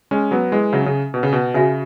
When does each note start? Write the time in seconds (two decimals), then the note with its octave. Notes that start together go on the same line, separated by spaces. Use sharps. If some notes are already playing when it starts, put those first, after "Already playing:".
0.11 G#3 C#4
0.31 F#3 B3
0.52 E3 G#3
0.72 C#3 F#3 C#4 G#4 E5
0.86 C#3
1.14 B2
1.23 C#3
1.33 B2
1.54 C#3 F#4 E5 G#5